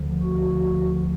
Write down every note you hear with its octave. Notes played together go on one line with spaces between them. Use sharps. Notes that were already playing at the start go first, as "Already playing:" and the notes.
Already playing: D2 D3 F3
F#4